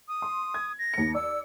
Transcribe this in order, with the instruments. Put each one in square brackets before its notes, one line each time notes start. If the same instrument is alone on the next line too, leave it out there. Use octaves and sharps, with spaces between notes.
[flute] D#6
[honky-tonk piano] C6
G#6
[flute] A#6
[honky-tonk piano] D#2 C#7
[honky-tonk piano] D5 [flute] E6